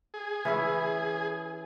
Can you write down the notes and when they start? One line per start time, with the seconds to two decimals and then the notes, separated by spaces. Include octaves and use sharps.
0.14 G#4
0.45 E3 C#4 E4